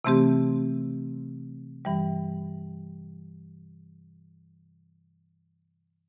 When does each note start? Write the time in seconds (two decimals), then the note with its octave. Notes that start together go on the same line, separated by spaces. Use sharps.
0.04 C3 E3 A3 C4 G4
1.85 G2 E3 G3